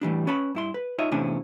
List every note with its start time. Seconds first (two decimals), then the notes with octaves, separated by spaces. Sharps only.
0.01 A2 E3 G3 D4
0.27 C#4 B4 C#5 A5 B5
0.55 G2 E4 C6
0.74 B4
0.98 D#4 F4 C#5 D#5 E5
1.11 E2 A2 C3 C#4 D4 G#5